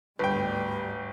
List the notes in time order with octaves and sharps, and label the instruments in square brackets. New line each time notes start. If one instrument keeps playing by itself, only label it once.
[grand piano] G1 G5 [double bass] D2 G#2 [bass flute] G3 [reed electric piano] B4